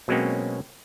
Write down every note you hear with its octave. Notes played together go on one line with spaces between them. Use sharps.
B2 F#3 G#3 A#3 C4 C#4